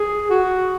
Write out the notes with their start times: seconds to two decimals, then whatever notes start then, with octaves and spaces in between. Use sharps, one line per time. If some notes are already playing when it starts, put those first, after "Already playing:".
Already playing: G#4
0.30 F#4